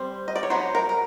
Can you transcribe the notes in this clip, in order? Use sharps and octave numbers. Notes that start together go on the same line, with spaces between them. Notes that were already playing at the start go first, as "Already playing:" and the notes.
Already playing: G3 C4 C5
D#5
D5
C#5
F#3 B3 D#4 C5
A#4
A#4